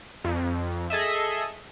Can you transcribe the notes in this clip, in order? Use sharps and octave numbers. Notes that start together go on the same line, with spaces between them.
F2
G#4 A4 D#5 E5